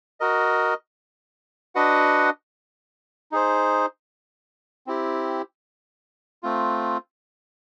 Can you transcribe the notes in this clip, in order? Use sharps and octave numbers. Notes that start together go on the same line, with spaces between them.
F#4 A#4 D#5
D4 F#4 B4 D#5 F#5
D#4 G#4 C5
C4 E4 G4
A3 C4 F4